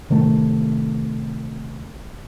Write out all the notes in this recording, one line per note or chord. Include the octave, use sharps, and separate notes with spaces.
A2 C3 D#3 A3